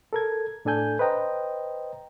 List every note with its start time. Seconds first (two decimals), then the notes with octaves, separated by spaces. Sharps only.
0.13 A4 A#4 G#6
0.65 A2 D4 A4 G#5 G6
0.99 B4 C5 D#5 G5 A#5